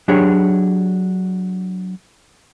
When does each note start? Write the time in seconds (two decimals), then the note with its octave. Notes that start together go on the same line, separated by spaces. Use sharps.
0.08 F#3 D4 G4 G#4 C#5